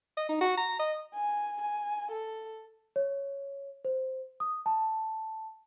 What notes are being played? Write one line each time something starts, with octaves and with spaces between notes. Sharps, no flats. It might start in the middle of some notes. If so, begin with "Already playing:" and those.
D#5
D#4
F#4
A#5
D#5
G#5
G#5
A4
C#5
C5
D#6
A5